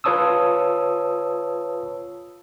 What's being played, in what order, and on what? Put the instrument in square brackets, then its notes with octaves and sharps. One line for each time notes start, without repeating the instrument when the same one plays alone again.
[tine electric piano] F4 B4 C#5 A5 D#6 E6